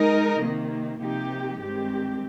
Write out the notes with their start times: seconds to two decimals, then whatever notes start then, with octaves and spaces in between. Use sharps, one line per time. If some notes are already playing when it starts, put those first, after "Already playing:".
Already playing: G#3 D#4 A#4 D#5
0.41 C3 D#3 A#3
1.00 C3 F3 A#3 D#4 G4
1.59 G2 D#3 G#3 C4 G4